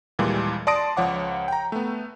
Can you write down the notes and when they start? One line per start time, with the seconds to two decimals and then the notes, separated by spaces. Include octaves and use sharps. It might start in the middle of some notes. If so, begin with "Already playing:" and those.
0.19 D#2 A#2 E3 G3 G#3
0.67 D5 A5 C6 D#6 A#6 D7
0.97 C#2 F3 C#5 F#5 D6
1.48 G5 A#5
1.72 A3 B3